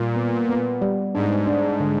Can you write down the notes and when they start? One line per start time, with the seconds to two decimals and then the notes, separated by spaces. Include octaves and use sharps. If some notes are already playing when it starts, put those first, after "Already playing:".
Already playing: A#2 G3
0.16 B3
0.49 B3
0.82 G3
1.14 G#2 D4
1.47 D4
1.80 D3